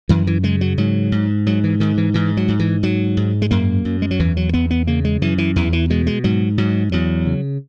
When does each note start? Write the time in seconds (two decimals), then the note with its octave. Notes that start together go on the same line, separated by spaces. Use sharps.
0.09 F#2 E3
0.27 E3
0.43 C#3 G#3
0.61 F#3
0.78 G#2 F#3
1.12 G#2
1.46 G#2 F#3
1.64 E3
1.80 G#2 D#3
1.98 E3
2.14 G#2 E3
2.37 F#3
2.48 G#2
2.60 E3
2.83 G#2 F#3
3.17 G#2
3.42 G#3
3.51 F#2 A#3
3.85 F#2
4.02 G#3
4.11 F#3
4.20 E2 E3
4.37 F#3
4.53 E2 B3
4.71 B3
4.87 C#3 A#3
5.05 G#3
5.22 F#2 E3
5.38 E3
5.56 E2 E3
5.73 E3
5.90 B2 G#3
6.07 G#3
6.24 G#2 F#3
6.58 G#2 F#3
6.92 E2 F#3
7.26 C#3